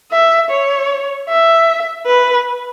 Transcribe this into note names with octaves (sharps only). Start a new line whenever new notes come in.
E5
C#5
E5
B4